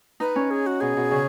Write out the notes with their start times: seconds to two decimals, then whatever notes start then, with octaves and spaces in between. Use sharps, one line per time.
0.20 D#4 B4
0.36 C#4
0.51 G#4
0.66 F#4
0.81 B2 G#4
0.97 B2
1.11 C#3